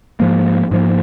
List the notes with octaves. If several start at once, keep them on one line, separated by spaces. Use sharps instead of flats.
G#2 F3 A#3
G#2 F3 A#3